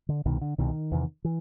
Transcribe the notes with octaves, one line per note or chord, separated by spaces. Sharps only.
D3
C2 B2 D#3
D3
C2 B2 D#3
E2 C3
E3